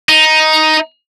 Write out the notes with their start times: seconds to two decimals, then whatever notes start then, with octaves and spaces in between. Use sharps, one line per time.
0.09 D#4